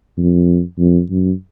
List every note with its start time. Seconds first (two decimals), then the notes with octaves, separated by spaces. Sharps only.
0.18 F2
0.79 F2
1.10 F#2